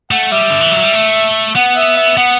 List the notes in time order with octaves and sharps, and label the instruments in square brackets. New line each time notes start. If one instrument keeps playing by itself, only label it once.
[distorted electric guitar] A3 [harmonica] F#5
[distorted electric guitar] G3 [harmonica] E5
[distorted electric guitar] D3
E3
F#3
G3
A3
[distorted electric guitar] B3 [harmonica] F#5
[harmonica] E5
E5
[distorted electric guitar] B3 [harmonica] F#5